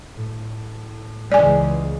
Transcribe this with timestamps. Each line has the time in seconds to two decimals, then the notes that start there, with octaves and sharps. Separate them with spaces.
0.16 A2
1.32 C#2 E3 G#3 D5 G#5